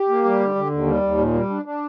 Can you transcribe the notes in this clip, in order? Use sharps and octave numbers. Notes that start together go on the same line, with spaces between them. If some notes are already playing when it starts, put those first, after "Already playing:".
Already playing: G4
A#3
G3
D3
D3
D#2
G3
D#2
A#2
G3
D4
D4